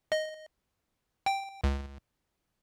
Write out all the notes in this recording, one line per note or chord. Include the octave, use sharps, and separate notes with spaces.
D#5
G5
C#2